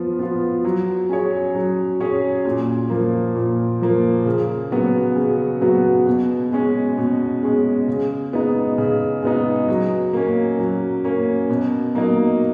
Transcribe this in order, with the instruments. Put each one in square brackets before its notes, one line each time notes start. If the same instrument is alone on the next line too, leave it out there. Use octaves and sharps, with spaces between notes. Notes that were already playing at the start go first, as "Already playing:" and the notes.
Already playing: [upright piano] F3 B3 F4
B3 F4
F#3
C#4 G#4 C#5
F#3
C#4 G#4 C#5
A#2
F3 A#3
A#2
F3 A#3
C#3
F#3 B3 F#4
C#3
F#3 B3 F#4
B2
G#3 C#4
B2
G#3 C#4
C#3
G#3 B3 D#4
C#3
G#3 B3 D#4
F#3
A#3 C#4
F#3
A#3 C#4
B2
F#3 A#3 D#4